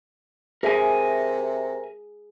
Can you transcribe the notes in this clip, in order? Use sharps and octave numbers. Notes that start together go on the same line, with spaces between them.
C3 G#4 A#4 E5 G#5